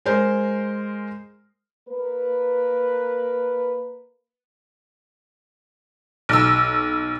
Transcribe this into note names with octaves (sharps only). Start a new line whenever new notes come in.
G#3 A#4 C5
A#3 A#4 B4
B1 E6